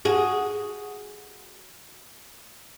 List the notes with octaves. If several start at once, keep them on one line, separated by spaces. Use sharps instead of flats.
F#4 G#4